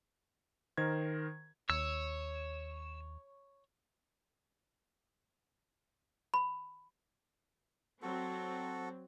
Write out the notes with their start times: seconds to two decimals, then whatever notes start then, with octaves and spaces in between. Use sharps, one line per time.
0.77 D#3 A#4 C5 G#6
1.70 D#2 C#5 E6
6.34 B5
8.02 F#3 C4 F#4 A4